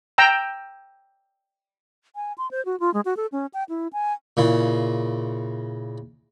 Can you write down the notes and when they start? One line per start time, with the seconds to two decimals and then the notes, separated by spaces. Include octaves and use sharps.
0.18 G5 A#5 E6
2.16 G#5
2.38 C6
2.51 C5
2.65 F#4
2.80 F4
2.94 G#3
3.05 F#4
3.17 A4
3.32 C#4
3.54 G5
3.69 E4
3.93 G#5
4.37 A#2 C#3 E4